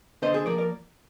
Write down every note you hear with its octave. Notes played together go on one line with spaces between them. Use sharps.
D3 C5 D#5
G#4 C5
F3 A#3 A#4 D5
A#4 D5